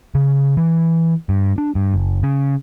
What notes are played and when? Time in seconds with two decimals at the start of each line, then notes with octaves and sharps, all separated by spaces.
0.15 C#3
0.57 E3
1.29 G2
1.58 D4
1.75 G2
1.94 F#1
2.23 C#3